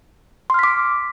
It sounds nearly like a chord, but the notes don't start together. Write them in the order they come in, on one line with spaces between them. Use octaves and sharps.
C6 F6 B6 D6